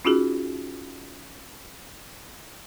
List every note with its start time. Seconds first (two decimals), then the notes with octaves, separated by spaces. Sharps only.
0.05 C#4 D#4 F4 F#4 G#4